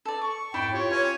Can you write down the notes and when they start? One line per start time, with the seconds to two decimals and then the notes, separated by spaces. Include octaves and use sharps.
0.05 A4 D5
0.22 C#6 D6
0.54 F2 G#2 E4 D5 G5
0.73 F4 G4 C#5
0.90 C#4 B4 G#5